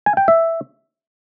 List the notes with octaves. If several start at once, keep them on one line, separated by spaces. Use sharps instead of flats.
G#5
G5
E5